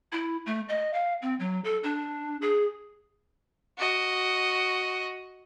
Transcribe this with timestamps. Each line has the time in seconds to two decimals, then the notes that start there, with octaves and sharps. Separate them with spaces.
0.12 E4
0.46 A3
0.69 D#5
0.93 F5
1.22 C4
1.40 F#3
1.64 A4
1.83 D4
2.42 G#4
3.78 F#4 D#5